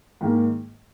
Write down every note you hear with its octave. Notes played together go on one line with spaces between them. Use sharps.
G#2 D#3 A#3